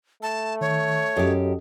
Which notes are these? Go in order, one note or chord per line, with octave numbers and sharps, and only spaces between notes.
A3 A5
D#3 C#5
F#2 F#4 G4 A4 D#5